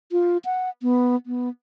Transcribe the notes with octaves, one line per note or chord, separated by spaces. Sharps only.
F4
F#5
B3
B3